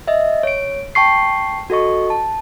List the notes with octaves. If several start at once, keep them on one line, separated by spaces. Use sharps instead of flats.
D#5 E5
C#5 D7
G5 A5 C#6 C7
F#4 A4 D#5 C#6
A5